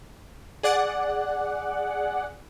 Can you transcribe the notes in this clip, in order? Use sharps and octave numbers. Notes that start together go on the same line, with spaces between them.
G#4 D5 F#5